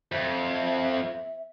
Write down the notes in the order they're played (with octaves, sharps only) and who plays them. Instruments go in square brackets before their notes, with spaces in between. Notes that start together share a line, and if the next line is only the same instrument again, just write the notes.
[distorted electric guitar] F2 [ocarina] E5